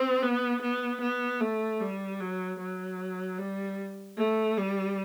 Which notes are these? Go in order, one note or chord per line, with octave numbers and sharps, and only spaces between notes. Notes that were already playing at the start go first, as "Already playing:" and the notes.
Already playing: C4
B3
B3
B3
A3
G3
F#3
F#3
G3
A3
G3